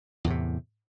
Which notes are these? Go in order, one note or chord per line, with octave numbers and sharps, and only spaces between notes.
E2 A2 C3